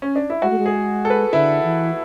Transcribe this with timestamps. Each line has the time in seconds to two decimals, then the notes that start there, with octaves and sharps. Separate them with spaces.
0.02 C#4
0.16 D4
0.30 E4
0.42 G#3 F#4
0.50 A3
0.58 G#3
0.66 G#4
1.05 A4
1.10 B4
1.33 D3 E4
1.63 E3